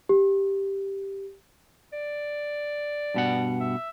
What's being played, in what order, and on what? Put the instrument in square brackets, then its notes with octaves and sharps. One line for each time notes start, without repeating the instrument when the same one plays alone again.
[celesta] G4
[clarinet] D5
[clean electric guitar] G2 B2 F#5
[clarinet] E5